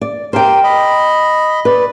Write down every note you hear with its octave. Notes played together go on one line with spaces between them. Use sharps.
D5
G4 A#4 C5 G5
D#5 B5
B4 D5